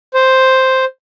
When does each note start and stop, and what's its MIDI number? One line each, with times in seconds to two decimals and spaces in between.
0.14 0.85 72